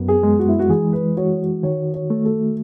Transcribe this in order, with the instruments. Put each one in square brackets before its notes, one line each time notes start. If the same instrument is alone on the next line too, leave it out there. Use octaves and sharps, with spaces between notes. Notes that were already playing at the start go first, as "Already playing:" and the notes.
Already playing: [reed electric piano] F#2 B3
[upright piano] G#4
[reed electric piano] G#3
[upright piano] F#4
E4
F#4
[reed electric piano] E3 [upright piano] G#4
[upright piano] B4
[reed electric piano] F#4 [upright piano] C#5
[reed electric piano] D#3 [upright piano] C#5
[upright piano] C#5
[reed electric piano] A3
[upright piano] A4